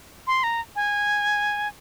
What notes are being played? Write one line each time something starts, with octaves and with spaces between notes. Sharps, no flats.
C6
A#5
G#5